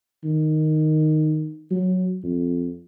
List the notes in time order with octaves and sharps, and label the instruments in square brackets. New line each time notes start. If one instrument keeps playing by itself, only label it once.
[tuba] D#3
F#3
F2